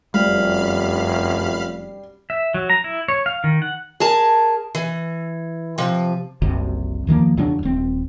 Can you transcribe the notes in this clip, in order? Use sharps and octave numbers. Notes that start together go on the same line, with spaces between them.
F1 F#2 G3 F5 B5 F6 C7
E5
F#3
A#5
E4
C#5
F5
D#3
F#5
G#4 A#4 A5
E3
C3 F3
F#1 C2 F#2 C3
E2 D#3 F3 A#3
E2 C#3 F#3 D4
D#1 C4